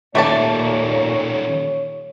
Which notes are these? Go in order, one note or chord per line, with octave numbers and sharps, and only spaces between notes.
D#2 A#2 D#3 A3 C#4 C#5 D5 A5